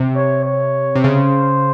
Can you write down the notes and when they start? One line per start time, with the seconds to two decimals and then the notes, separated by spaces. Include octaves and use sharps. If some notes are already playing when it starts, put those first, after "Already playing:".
Already playing: C3
0.16 C#5
0.45 C#5
0.95 C3
1.04 C#3 C5